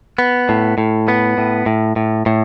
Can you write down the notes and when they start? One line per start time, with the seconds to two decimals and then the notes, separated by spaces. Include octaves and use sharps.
0.18 B3
0.49 A2
0.78 A2
1.08 B3
1.38 A2
1.66 A2
1.96 A2
2.26 A2